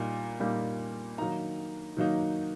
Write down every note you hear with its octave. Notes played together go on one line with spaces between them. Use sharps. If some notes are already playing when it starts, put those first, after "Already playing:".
Already playing: A#2 G3 A#3 D#4
A#2 G3 A#3 D#4
D#3 F#3 A#3 D#4 A#5
D#3 F#3 A#3 D#4